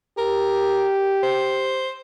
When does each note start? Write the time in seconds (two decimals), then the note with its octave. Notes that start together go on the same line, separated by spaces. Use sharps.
0.18 G4 A#4
1.23 C5